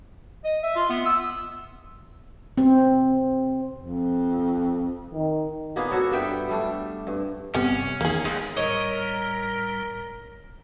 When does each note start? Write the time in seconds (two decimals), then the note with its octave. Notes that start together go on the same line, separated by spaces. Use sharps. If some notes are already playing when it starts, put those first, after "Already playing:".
0.44 D#5
0.63 E5
0.76 F4
0.90 B3
1.05 E6
2.58 C4
3.78 F2
5.14 D#3
5.76 A#2 A#3 B3 G#4
5.91 A#3 F#4 A4 C#5
6.11 G2 B3 E5 G5
6.49 G3 A3 D4
7.07 G2
7.55 G1 C3 G3 B3 C#4
8.01 E2 D#3 A#3 G#4
8.25 D#2 G#3
8.57 A2 G3 A#4 C#5 D#5